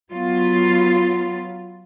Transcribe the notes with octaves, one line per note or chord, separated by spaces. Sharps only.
F#3 B3 F4